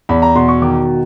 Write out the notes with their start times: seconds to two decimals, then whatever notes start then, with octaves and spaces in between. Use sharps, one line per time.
0.09 E2 B5
0.22 A#5
0.36 B2 C6
0.49 C#6
0.62 D#3 D6